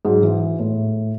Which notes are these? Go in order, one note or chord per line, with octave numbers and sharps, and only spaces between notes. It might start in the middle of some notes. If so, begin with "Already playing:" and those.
G#2 F#3
E3
A2